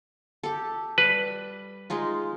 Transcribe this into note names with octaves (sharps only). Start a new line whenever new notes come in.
G4 A4
G3 B4
G#3 D#4 F4